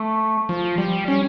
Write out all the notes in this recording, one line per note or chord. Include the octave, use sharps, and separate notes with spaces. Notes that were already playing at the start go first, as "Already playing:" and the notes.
Already playing: A3
F3
G3
C#4